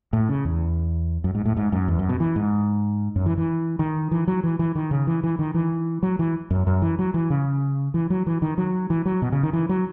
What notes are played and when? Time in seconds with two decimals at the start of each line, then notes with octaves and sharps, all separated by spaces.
0.13 A2
0.29 C#3
0.45 E2
1.24 F#2
1.35 G#2
1.45 A2
1.57 G#2
1.72 F#2
1.88 E2
1.99 F#2
2.09 B2
2.20 E3
2.36 G#2
3.16 F#2
3.26 E3
3.38 E3
3.79 D#3
4.11 E3
4.28 F#3
4.44 E3
4.59 E3
4.75 D#3
4.91 C#3
5.07 E3
5.24 E3
5.39 D#3
5.54 E3
6.03 F#3
6.19 E3
6.51 F#2
6.67 F#2
6.82 E3
6.99 F#3
7.14 E3
7.30 C#3
7.94 E3
8.10 F#3
8.27 E3
8.42 D#3
8.58 F#3
8.90 E3
9.06 F#3
9.22 B2
9.32 C#3
9.43 D#3
9.53 E3
9.69 F#3